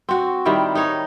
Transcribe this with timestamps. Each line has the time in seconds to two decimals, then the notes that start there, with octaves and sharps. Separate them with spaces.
0.09 C4 F#4
0.45 D#3 G3 E4 G5
0.75 D#4 C#5